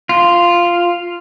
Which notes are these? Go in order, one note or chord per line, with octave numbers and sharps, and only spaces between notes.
F4